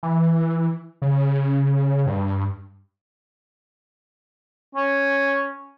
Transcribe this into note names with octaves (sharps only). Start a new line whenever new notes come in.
E3
C#3
G2
C#4